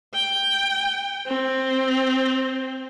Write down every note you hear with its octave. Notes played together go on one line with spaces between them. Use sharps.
G5
C4